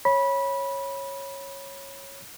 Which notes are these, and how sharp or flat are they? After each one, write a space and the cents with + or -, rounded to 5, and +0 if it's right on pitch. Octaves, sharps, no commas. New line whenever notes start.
C#5 -10 B5 -20